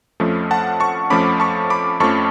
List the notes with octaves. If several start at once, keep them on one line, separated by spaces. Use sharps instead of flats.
F2 F3 A3 C#4
F#5 A5
A5 C#6
F2 F3 A3 C#4 B5 D6
A5 C#6
B5 D6
F2 F3 A3 C#4 A5 C#6